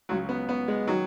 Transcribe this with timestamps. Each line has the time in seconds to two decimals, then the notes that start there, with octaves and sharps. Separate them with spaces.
0.09 C#2 C#3 F#3
0.29 B3
0.49 B3
0.68 G#3
0.87 D#3 F#3